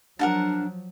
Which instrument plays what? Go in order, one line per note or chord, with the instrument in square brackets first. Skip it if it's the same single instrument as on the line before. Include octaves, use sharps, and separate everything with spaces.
[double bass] F3 F#3 [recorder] D4 [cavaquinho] A#4 F#5 A5